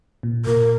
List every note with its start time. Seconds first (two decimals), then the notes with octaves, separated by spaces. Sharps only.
0.23 A#2
0.46 A#2 A#4